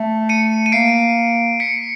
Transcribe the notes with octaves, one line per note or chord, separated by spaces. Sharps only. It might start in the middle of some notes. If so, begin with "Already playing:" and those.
Already playing: A3
C#7 D#7
D#7
A#3 C7 D7
B6 C#7